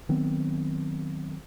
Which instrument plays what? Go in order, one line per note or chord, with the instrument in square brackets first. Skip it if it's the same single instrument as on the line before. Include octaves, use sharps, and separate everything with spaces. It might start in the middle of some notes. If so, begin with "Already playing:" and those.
[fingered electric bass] D#3 F#3 B3 C4